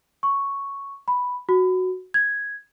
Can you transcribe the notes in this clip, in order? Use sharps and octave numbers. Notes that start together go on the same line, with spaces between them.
C#6
B5
F#4
G#6